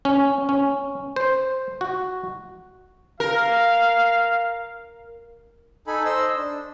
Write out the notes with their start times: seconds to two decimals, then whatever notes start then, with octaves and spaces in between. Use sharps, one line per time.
0.05 C#4
0.49 C#4
1.16 C5
1.81 F#4
3.20 A#4 F5
5.87 D#4 A4 G#5 B5
6.05 C5 D#5 C6 E6
6.36 D4